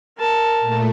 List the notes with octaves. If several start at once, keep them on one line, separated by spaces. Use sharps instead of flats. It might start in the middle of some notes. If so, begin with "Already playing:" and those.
A#4 A5
A#2 A3